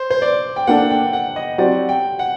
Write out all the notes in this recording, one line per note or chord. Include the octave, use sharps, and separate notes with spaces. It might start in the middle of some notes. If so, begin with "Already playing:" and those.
Already playing: C5
C5
D5
G5
A#3 D4 A4 F#5
G5
F#5
D#5
F#3 C4 G4 D5 F#5
G5
F#5